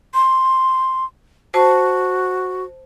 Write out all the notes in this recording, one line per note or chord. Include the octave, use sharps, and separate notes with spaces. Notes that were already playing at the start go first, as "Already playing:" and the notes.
C6
F#4 C5 A5